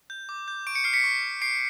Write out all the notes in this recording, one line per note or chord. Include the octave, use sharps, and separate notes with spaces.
G6
D6
G6
C#6 D7
C#7
F6 C7
B6 C#7
C#6
F6
C#6 C7 D7